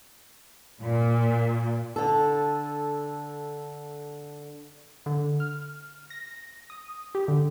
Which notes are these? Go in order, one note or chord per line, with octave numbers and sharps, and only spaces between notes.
A#2
D3 A4
D3
F6
A#6
D#6
G4
D3